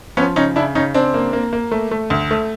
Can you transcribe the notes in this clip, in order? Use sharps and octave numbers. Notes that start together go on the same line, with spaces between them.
F3 B3 C#4
C#3 C#4 D#4
C#3 D4 E4
C#3 C#4 D#4
C#3 C4 D4
A#3
A#3
A#3
A3
A3
D2
A3